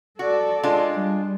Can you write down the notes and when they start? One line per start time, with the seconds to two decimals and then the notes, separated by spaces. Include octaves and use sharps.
0.19 F#4 A4 D5
0.63 G#3 D4 F4
0.95 G3